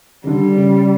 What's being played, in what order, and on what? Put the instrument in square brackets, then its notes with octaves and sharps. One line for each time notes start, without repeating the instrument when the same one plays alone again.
[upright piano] C#3
[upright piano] D3 [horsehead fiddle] G3
[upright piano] C#3